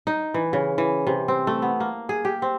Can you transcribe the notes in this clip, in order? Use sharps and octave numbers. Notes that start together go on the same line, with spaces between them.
D#4
E3
C#3
E3
C3
C4
A3
B3
A#3
G#4
G4
C4